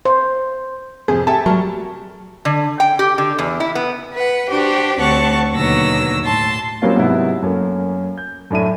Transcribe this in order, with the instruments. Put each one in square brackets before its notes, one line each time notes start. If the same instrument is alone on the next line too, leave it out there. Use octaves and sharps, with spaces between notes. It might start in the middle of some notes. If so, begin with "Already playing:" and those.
[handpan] C5
[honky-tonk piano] F2 C3 [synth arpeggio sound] G#4 [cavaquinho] C5
[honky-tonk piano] G4 E5 A5 [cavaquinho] A4 G#5
[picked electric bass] F#3 [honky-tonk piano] G3 A#4 [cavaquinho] C#6
[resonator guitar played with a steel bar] D3
G5
G4
D3
E2
E4
B3
[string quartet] B4 F#5
D4 F#4 G4 C5
D2 C4 C#5 F#5 A5 C#6
D#2 B2 D3 F#3 E6 A#6
A2 A5 C6
[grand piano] F#3 G3 A#3 C4 C#4 F4
G#2 C3 F#3 B3 E4
F#2 A3 A#3 C#4
G6
F#2 A2 D4 E5 D#7